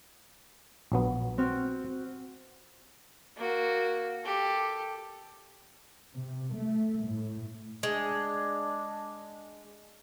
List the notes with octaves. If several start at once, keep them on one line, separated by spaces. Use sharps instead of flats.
A#1 F#3 B3
C4 F#4 F6
A#3 F#4
G4 A4
C3
A3
A2
G#3 D4